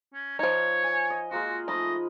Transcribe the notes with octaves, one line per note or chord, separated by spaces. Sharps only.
C#4
F3 D#4 C#5
G#5
D#5
G#3 A#3 F4 F#4
F3 A3 D#4 D#5 B5